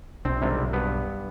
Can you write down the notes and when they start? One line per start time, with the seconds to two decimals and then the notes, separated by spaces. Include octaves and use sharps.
0.25 B1 C4 D4
0.42 G#1 C3 G3
0.73 G2 B3